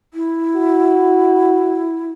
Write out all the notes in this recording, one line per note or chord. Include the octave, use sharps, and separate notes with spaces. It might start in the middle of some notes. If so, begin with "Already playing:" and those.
E4
F#4